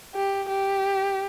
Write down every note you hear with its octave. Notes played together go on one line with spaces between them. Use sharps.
G4
G4